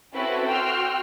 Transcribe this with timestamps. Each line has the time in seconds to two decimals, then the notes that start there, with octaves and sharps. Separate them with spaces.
0.13 C4 C#4 E4 F#4 A4 B4
0.45 F#4 G5 C6 E6 F6